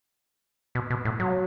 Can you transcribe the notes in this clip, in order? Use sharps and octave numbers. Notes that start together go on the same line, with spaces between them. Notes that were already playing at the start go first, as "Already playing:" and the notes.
B2
B2
A2
F#3